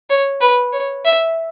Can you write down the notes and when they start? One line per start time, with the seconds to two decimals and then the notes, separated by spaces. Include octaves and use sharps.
0.10 C#5
0.41 B4
0.72 C#5
1.05 E5